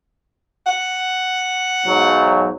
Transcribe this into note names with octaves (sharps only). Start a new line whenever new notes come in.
F#5
B1 G#2 F#3